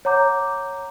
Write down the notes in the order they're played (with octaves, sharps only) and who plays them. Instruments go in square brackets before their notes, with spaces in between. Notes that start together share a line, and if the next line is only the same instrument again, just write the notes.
[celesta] C#5 F#5 A#5 D6 G6